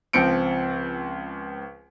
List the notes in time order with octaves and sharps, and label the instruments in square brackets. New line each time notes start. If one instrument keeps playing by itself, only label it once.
[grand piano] C#2 F3 C4 C#7 D7